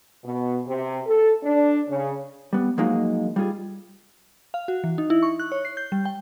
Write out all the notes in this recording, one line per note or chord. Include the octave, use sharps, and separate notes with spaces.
B2
C3
A4
D4
C#3
G3 B3
F3 F#3 G#3 A#3 D#4
G3 F4 G#4
F5
F#4
E3
D#4
E4
C#6
F#6
C#5
C7
G6
G3
G5